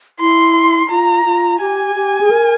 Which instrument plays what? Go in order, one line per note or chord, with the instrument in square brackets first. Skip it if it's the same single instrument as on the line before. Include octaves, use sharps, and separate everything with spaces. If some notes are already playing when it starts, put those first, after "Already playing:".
[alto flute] E4 [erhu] C6
[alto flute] F4 [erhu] A#5
[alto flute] F4
[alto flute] G4 [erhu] G#5
[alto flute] G4
G#4
A#4